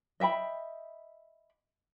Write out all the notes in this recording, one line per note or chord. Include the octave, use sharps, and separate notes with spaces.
D#5 E5 G5 B5